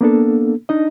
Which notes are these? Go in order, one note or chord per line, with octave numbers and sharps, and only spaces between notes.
A#3 B3 D4 A4
D4 D#4 D#5